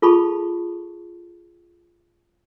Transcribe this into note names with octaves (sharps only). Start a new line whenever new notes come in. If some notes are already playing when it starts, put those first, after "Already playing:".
F4 G#4 A4 A5 B5 C#6